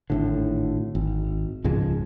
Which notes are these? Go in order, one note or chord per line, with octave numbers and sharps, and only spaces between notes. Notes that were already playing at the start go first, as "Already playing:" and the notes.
G#1 A2 D3
G#1
C#2 G#2 F3 G#3